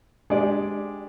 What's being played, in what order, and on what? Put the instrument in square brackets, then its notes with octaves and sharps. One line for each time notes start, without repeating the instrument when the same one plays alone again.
[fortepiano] G#3 D4 G4 D5